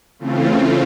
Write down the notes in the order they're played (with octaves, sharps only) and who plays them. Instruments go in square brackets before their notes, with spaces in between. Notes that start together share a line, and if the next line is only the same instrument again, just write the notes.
[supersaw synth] C#3 E3 A3 C4 F4